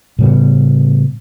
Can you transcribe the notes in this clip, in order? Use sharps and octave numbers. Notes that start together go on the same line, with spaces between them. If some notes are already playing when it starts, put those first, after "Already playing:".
A2 C#3 G3 B3